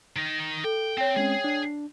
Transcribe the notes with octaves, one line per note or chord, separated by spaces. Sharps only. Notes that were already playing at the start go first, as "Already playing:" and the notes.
D#3 D#4
A4 G5
C4 C#5 G5
G#3 C4 C#4 G#4
D4